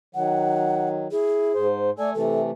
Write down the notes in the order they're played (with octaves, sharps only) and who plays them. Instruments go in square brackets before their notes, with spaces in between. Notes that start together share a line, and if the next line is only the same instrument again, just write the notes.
[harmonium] D#3 F#3 [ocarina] F#5
[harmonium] E4 [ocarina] G#4
[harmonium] G#2 C5
[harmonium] A3 A4 G#5 [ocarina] D5
[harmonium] C3 E3 A3 [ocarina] A4